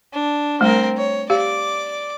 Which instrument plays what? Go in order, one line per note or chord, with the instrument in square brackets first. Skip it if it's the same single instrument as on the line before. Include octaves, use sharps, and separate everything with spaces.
[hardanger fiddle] D4
[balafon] G3 A3 [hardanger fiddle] C4 A#4
[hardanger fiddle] C#5
[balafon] G4 F5 [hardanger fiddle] D5 D6